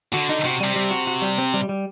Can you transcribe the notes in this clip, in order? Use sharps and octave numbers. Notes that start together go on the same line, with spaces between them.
D3 F#4
D#4
C3 F#4
C3 G3
G3
F#4
F#4
G3
C4
G3
G3